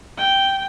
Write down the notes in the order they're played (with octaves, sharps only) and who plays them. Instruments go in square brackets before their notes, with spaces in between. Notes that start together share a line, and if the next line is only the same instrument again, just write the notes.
[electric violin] G5